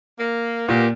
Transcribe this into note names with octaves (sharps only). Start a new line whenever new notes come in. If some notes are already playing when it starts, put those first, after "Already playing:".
A#3
A#2 A#3 B3 G4